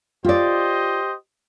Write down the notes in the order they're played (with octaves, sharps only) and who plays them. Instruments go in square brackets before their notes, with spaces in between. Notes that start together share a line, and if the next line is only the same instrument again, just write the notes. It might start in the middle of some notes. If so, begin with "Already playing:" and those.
[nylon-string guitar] F4 D5 [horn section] G4 C5 D#5